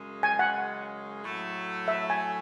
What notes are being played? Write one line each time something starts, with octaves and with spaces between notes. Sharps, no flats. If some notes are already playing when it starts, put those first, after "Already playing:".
Already playing: F#2 C#3 G#3
G#5
F#5
A2 F#3 A3
E5
G#5